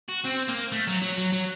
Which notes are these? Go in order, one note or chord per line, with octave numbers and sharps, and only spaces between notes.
F#4
C4
A#3
A3
F#3
F#3
F#3
F#3